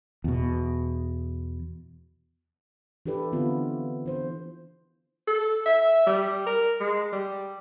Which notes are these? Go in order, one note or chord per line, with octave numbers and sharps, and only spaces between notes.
E2 B2
E3 D4 G4 A4 B4 D5
D3 B3 C4 F4
E3 C5
A4
E5
G3
A#4
G#3
G3